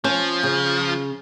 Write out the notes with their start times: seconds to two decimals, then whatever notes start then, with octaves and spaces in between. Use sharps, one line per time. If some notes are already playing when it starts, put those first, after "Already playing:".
0.04 F3 C#4
0.43 C#3